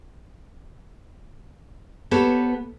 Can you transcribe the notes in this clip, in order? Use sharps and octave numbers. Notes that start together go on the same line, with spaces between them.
B3 G4 A4 C5 C#5